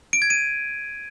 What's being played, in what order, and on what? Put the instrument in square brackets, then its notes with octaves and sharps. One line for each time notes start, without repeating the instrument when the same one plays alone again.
[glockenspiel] D7
G#6
D#7